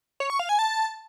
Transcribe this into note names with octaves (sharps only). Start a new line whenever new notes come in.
C#5
C#6
F5
G#5
A5